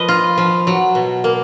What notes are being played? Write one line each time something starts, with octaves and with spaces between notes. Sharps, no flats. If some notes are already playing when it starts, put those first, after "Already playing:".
Already playing: F3 B4 D#5
F4
F3
F#3
B2
A#3